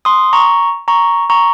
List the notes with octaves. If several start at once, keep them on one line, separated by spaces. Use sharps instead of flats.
C6 D#6
A#5 C#6
A#5 C#6
A#5 C#6